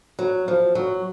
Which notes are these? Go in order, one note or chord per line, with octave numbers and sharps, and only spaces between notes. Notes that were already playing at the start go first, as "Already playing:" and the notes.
F#3
F3
F#3